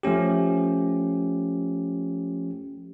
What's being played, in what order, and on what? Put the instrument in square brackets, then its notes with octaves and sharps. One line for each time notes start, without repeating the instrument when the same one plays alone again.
[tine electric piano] F3 A3 C#4 G4